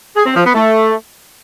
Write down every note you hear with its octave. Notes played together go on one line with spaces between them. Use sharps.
G#4
C4
F3
B3
A3